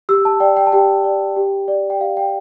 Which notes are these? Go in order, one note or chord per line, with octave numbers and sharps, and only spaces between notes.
G4 E6
A5
D5 G5
G5
A5
G4 G5
D5
G4
D5
G5
G4 F5
G5